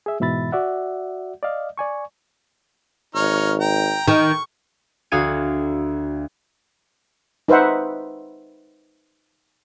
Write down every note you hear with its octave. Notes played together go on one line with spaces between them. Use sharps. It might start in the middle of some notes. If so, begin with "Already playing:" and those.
G#4 E5
G#2 B2 E3 E5 B5 A6
F#4 D5 E5 F#5
D5 D#5 F5
D5 G#5 C#6
G#1 D#4 C#5 F6
G5 A#5
D#3 C#6
D2 F#4 F5 D#6 G#6 D#7
D#4 B4 C5 E5 F#5